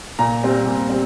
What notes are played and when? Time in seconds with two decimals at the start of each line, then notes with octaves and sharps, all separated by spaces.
0.19 A#2 A#5
0.43 G3 C4
0.66 A#2
0.90 G3 C4